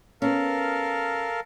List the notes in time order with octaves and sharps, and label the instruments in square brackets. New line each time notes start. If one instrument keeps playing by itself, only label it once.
[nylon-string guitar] B3 C#4 [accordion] A4 A#4 F5